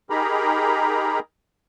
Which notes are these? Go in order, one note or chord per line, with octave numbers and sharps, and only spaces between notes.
D#4 G4 G#4 A#4 A#5 B5